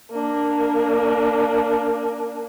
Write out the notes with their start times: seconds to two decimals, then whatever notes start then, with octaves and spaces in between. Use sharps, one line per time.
0.11 A#3 D4